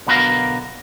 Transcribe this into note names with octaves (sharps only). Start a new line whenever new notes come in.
B1 D3 B3 F#4 A#4 F5